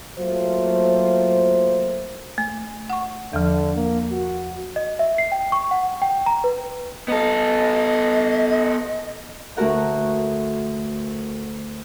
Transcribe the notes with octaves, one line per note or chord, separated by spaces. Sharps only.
F#3 A3 A#3 F4 C5
A3
F#5 C#6
E2 D3 F3
A#3
F#4
D#5
E5
C7
G5
C#6
F#5
G5
A#5
B4
B3 A4 D#5
D2 A3 F#4 A#4 F#5